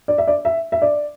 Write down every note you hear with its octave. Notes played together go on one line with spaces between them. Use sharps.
D5
E5
D5
E5
E5
D5